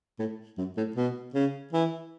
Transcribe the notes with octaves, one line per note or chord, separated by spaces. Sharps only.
A2
F#2
A2
B2
C#3
E3